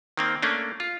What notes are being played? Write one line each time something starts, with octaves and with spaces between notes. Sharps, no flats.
D#3 A#3 C4
A3 A#3 C#4 D4
F4